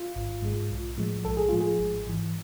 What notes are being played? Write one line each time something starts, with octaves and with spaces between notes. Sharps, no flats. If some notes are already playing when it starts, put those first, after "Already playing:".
Already playing: F4
G#1
G#2 G#3
B1
A2 F3 G#3
B1 A4
G#4
A2 F3 G#3 F4
G#4
G#1
G#2 E3